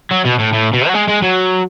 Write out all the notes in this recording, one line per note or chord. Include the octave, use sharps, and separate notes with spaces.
F#3
B2
A2
A2
B2
F#3
G#3
G#3
F#3